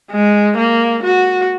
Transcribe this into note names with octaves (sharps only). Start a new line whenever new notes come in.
G#3
A#3
F#4